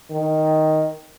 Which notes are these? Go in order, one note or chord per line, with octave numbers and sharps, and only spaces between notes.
D#3